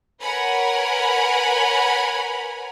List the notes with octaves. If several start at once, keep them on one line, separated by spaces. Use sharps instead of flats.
A#4 B4 C#5 F#5 G#5 B5